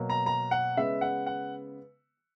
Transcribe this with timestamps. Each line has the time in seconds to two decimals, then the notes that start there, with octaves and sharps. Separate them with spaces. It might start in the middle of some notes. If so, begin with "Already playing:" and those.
Already playing: B2 F#3 A#3
0.10 A#5
0.26 A#5
0.51 F#5
0.77 C#3 G#3 B3 E5
1.01 F#5
1.26 F#5